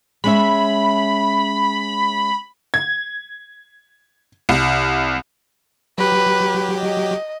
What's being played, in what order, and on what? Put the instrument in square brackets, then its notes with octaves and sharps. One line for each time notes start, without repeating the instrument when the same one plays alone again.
[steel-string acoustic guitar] G#3 C#4 E5 [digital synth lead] B5
[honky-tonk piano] G#6
C2
[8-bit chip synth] F#3 G4 [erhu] B4
[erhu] D#5